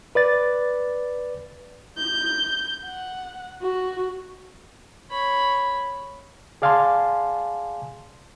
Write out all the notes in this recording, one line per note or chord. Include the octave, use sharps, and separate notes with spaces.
B4 D5 A6
G6
F#5
F#4
C#5 B5
G#4 D5 F5 G#5 A5 C6